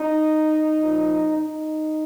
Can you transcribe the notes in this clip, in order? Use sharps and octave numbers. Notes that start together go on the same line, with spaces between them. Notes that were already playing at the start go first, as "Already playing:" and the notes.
Already playing: D#4
A#2 F3
D#4